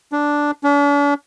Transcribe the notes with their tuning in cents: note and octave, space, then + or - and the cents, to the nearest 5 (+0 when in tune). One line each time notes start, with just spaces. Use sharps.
D4 -5
D4 -45